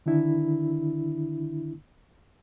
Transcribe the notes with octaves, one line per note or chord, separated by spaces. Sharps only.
D3 D#3 D4 E4